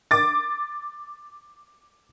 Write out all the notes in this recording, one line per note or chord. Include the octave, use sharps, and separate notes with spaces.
D6 A6